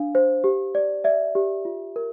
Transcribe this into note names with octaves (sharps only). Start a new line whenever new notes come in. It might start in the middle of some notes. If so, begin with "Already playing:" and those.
Already playing: D4 F5
C5
G4
D5
D5 E5
G4
F4
A#4